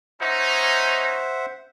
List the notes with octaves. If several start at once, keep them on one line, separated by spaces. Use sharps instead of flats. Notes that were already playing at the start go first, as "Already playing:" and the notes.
C#4 D#4 C5 E5 F#5